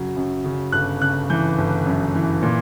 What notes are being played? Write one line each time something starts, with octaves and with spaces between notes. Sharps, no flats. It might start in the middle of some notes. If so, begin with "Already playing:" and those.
Already playing: F#2 C#3 F#3
F#2
C#3
G1 F#6
C#3 F#6
E3 G6
G1
F#2
E3
A#2